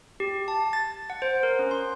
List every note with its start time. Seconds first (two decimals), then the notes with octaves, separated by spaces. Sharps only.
0.20 G4
0.48 A5
0.73 A6
1.10 F#5
1.22 C5
1.43 A#4
1.59 C#4
1.71 C6